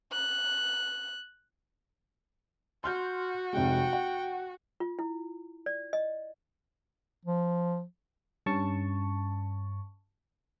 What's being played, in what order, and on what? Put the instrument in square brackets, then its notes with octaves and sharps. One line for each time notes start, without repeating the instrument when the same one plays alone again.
[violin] F#6
[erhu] F#4 [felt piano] C6 F6 G6
[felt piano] F1 C3 G#3 [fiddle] G5
[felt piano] F#5
[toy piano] F4
E4
D5
D#5
[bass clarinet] F3
[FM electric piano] G2 C#4 A5 C#6